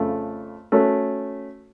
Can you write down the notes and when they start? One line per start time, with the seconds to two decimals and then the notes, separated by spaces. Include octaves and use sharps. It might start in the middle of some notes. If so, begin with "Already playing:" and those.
Already playing: F2 C#3 A3
0.72 A3 C#4 F#4